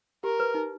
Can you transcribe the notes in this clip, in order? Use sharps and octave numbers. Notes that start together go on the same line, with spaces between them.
G4 A#4
B4
D#4